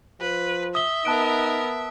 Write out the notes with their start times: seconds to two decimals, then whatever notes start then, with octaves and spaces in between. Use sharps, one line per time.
0.21 F3 B4
0.75 E5 D#6 G7
1.05 B3 D#4 A#4 A5 F#6 D7